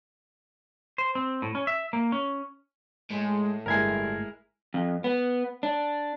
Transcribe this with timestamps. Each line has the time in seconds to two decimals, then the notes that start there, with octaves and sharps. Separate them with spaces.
0.98 C5
1.15 C4
1.42 A2
1.55 C#4
1.67 E5
1.93 A#3
2.12 C#4
3.11 A2 G#3
3.66 G1 G2 G#3 E4 A#4 G#6 C7
4.74 F2
5.04 B3
5.63 D4